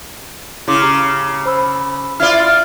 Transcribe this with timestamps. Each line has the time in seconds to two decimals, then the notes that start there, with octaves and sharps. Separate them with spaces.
0.68 C#3 E4 C6 D6
0.82 G4 A#5 D6
1.45 C5 B5 E6
2.20 E4 F4 D5 F6